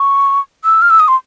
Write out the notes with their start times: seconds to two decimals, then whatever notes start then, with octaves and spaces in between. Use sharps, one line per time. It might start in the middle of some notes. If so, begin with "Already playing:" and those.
Already playing: C#6
0.65 E6
0.82 F6
0.90 E6
1.00 D#6
1.08 C6